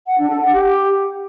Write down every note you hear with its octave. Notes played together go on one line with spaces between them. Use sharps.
F#5
D4
A4
F#5
G4